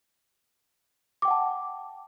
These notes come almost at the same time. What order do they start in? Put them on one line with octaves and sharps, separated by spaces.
D6 G5 F#5 A5